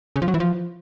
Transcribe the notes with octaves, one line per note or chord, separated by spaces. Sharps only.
C#3
F3
F#3
E3
F3